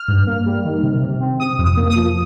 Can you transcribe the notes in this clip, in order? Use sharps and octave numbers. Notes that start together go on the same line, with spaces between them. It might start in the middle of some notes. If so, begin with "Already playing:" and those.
Already playing: F6
G2
A#3
G3
D#3
C3
C3
C4
C3 D#6
F2
D#6
A#3
D#6
F3